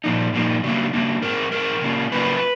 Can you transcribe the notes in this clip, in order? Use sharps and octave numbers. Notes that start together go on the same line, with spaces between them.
A#2 F3 A#3 D#4
A#2 F3 A#3 D#4
C#3 F#3 A#3 D4
C#3 F#3 A#3 D4
E3 G#3 C4 A#4
E3 G#3 C4 A#4
C#3 F#3 A#3 C#4 F4
C#3 F#3 A#3 C#4 F4 B4